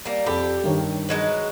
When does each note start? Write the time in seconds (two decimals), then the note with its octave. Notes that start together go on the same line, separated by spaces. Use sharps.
0.05 G3 A#3
0.26 F2 G4 A4 B5
0.64 G2 D#3 C#5
1.09 F#3 G#3 B4